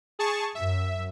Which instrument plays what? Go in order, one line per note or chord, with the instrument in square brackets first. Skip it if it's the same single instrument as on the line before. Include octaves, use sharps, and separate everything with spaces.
[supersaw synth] G#4 A5 C#6
[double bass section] F#2 [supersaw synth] E5